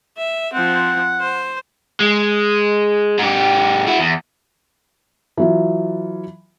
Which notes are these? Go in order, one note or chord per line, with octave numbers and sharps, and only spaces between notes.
E5
F3 C4 F#5
C5
G#3
G#2 G4
E4 F#4
E2
E3 F#3 F4